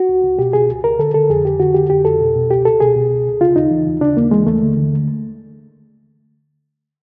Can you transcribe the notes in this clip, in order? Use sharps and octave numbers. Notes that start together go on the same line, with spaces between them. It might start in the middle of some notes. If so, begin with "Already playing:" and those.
Already playing: F#4
C#2
C#2
B2 G4
B2 G#4
C#2
C#2 A#4
D3 A4
D3 A4
F2 G#4
F2 G4
D3 F#4
D3 G4
F2 G4
F2 A4
B2
B2
C#2 G4
C#2 A4
B2 G#4
B2
C#2
C#2
C#3 F4
D#2 D#4
E3
D#2
C#3 D4
D#2 A#3
E3 G#3
D#2 A3
D3
D3